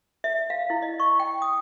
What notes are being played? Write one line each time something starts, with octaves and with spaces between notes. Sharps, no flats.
E5
F5
E4
D#5
C#6
G5
D#6